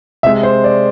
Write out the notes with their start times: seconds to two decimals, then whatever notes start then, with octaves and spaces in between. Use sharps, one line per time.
0.23 C3 G#3 E5
0.43 C5
0.64 D5